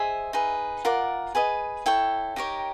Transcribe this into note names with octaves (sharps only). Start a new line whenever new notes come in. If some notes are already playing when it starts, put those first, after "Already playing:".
Already playing: G#4 C5 D#5 E5
D#4 G#4 B4
F4 A#4 D5 F#5
G#4 B4 D#5
E4 A4 C#5 G5
D#4 G4 A#4 C#5